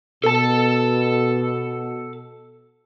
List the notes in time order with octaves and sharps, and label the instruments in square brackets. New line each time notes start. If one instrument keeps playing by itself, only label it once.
[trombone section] B2 [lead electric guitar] A4 A5